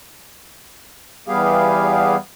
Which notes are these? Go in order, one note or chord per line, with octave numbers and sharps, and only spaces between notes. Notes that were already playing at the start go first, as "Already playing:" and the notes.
E2 G3 B3 G4 G#4 F5